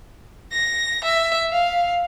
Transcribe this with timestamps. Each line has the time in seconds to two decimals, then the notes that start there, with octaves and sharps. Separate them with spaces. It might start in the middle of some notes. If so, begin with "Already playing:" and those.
0.52 A#6
1.04 E5
1.52 F5